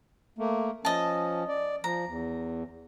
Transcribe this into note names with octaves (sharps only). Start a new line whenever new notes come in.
A3 A#3
F3 C#4 D#5 A5
D5
F3 A#5
E2